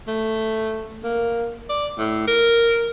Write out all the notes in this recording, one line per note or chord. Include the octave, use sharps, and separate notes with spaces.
A3
A#3
D5
A2
A#4